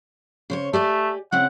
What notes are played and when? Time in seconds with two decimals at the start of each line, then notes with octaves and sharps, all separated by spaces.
0.50 C#3 C5 C#5
0.73 A3 G4 D5 G#5
1.32 C#3 C4 E4 F#5